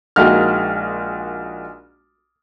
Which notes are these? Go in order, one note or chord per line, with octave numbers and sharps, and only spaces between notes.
A#1 G#3 A#3 D#4 F#4 F6